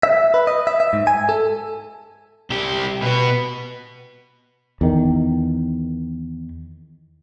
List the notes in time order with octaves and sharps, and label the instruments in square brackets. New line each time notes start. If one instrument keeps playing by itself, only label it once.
[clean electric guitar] E5
B4
D#5
E5
E5
G#2
G#5
A4
[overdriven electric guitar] C2 G4
B2 B3
[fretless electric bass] E2 D#3